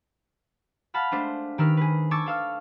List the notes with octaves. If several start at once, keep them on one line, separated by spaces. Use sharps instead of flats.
F5 F#5 A5 B5 F6
G#3 A3 D4 C5
D#3 G4 A#4 B4 E6 F6
G#4 B4
A5 C#6 D6 E6 G#6 A6
A4 F5 E6 F6